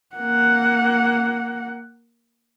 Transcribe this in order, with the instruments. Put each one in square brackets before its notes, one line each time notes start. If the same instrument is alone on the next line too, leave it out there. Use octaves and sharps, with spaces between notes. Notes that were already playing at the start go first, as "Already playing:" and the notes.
[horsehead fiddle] A#3 F#5